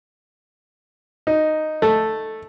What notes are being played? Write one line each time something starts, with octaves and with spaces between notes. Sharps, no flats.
D#4
A3